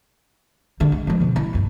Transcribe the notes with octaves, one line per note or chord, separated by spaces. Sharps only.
D3 G3
G#3
F3 G#3
B2 D3
E4
D2 G2